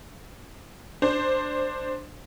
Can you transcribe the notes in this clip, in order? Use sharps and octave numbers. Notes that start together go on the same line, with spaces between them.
D4 C5